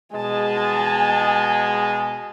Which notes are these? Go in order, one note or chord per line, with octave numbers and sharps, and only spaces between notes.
B2 G#3 G#5 A5